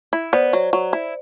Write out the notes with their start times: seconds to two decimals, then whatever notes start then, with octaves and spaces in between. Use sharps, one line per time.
0.13 E4
0.33 B3 C5 D5
0.53 F#3
0.73 F#3
0.93 E4